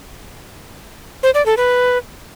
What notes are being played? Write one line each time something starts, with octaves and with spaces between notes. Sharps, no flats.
C5
D5
A4
B4